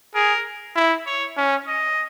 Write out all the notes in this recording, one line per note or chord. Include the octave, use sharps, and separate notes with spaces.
G#4 A#4
E4
C#5
C#4
D#5